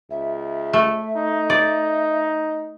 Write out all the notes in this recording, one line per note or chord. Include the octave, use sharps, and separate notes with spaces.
C#2 E5
A3
D#4
D5